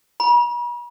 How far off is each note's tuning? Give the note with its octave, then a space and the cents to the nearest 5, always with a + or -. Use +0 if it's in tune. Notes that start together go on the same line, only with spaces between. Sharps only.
B5 -45